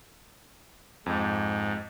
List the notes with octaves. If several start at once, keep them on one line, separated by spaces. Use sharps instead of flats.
F2 G#2